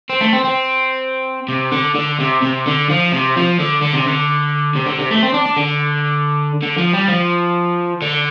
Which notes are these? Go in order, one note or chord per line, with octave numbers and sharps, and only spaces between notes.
C4
A3
C4
C4
C3
D3
D3
C3
C3
D3
F3
C3
F3
D3
D3
C3
D3
C3
D3
C3
A3
C4
D4
D4
D3
D3
F3
G3
F3
D3